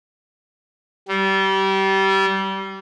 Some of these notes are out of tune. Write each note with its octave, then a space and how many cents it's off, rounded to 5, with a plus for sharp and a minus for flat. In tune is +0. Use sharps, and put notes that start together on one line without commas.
G3 -25